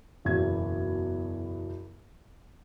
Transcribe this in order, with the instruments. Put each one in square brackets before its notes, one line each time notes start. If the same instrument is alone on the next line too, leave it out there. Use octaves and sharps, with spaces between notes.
[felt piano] F#1 E2 B2 E3 G#6